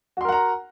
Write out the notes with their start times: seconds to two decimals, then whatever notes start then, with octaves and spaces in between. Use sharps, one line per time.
0.17 F#4
0.21 C6
0.25 A#4
0.29 F#5
0.32 A#5